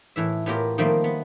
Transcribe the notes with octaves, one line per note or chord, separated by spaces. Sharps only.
A2 E3 E5
A2 B3 F4 G4 A#4
D#3 F3 G3 A3 A#3 C4
B3